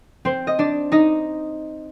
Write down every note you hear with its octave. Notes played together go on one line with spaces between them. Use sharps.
C4 C5
D#5
D4 D5
D#4 D#5